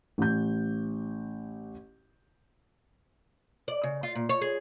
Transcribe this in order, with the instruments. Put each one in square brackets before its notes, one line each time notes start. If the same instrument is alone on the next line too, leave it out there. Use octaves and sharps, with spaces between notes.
[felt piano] A1 G6
[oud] D5
C#3
F4
A#2
C#5
G#4